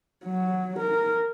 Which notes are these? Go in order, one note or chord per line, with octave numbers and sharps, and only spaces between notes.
F#3
A#4